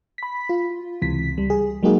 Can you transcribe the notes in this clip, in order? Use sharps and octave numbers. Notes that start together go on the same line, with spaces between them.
B5 B6
F4
C#2 C3 E3 B6
C#2 G3
G#4
F#3 G#3 A#3 D#4 F#4 G#4